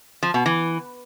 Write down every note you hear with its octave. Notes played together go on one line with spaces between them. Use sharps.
F3
B2
E3